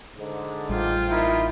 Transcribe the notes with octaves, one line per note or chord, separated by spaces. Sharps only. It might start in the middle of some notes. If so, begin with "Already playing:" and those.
G#2 D3
A1 G3 F4 G5
A#3 D#4 E4